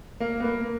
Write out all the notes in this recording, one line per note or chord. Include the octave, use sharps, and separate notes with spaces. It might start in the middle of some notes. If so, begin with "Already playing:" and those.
A#3
B3
A#3